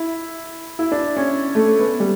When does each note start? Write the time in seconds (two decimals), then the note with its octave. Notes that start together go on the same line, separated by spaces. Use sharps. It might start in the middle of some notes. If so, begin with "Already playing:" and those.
Already playing: E4
0.79 E4
0.92 D4
1.17 C#4
1.55 A3
1.80 B3
2.00 G3